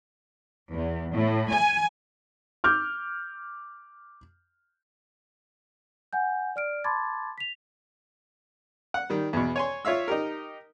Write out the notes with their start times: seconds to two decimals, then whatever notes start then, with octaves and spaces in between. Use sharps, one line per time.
0.72 E2
1.13 A2
1.51 G#5
2.64 D6 F6 G6
6.13 F#5 G#5 G6
6.56 D5 F6 D7
6.84 A5 B5 C6 D6 G#6 A6
7.38 B6 F7
8.94 F#5
9.10 D#3 G3
9.33 E2 B2
9.56 C#5 G#5 C6
9.85 F4 C#5 E5 F5 E6
10.08 D#4 G4 A#4